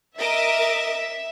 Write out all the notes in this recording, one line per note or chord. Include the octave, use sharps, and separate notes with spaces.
A#4 D#5 E5 D6